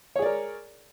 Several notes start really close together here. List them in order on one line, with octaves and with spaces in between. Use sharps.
C#5 G#4 D5 A#4